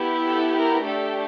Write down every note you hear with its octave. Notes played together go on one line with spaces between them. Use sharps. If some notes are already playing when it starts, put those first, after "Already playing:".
Already playing: B3 E4 G4
A4
A#4
A3 D4 G4 A4